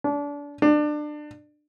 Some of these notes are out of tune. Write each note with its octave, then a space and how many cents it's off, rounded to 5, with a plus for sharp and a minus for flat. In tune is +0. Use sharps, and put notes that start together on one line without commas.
D4 -30
D4 +25